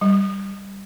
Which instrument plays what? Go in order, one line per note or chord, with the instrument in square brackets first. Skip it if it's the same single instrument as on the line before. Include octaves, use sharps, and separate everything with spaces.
[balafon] G3